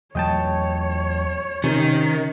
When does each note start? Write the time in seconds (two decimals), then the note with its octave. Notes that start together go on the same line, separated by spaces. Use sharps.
0.15 E2 F#3 A3 C#5 D#5 G5 A5
1.64 C3 D#3 C#4